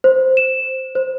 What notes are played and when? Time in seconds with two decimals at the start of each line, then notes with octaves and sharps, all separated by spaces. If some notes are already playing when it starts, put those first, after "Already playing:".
0.04 C5
0.37 E7
0.95 C5